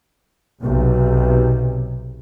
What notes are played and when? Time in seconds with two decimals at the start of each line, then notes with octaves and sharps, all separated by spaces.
0.60 B1 C3